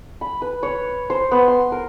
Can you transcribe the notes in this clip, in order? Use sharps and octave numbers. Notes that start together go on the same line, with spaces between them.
B5
B4
C#5
C5
B3
C6
A#4